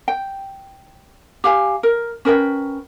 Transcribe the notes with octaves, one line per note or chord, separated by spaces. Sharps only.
G5
G4 F5 G#5
A#4
C#4 A#4 B4 G5